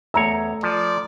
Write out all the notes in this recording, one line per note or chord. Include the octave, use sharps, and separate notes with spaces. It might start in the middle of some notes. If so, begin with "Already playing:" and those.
E2 A3 C#5 A#5 E6
F3 D5